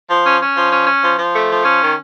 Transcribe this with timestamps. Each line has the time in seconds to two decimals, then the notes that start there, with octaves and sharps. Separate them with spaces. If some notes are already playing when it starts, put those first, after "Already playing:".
0.09 F3
0.24 C#4
0.41 C#4
0.56 F3
0.71 C#4
0.87 C#4
1.03 F3
1.19 F3
1.34 A3
1.49 F3
1.65 C#4
1.81 D#3